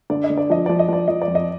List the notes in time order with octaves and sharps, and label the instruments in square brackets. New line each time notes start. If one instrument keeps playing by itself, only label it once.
[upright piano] D3 [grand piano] D5
[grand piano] D#5
[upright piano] D3
[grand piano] D5
[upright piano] F3 [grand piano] D#5
[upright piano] F3 [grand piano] D5
[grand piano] D#5
[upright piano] F3 [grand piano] D5
[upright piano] F3 [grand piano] D#5
[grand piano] D5
[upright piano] F2
[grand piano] D#5